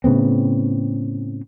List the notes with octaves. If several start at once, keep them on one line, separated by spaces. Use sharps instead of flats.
A2 C#3 B3 C4